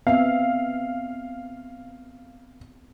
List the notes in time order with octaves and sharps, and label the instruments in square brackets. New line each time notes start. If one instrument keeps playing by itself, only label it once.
[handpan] B3 C4 E5 [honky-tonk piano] F5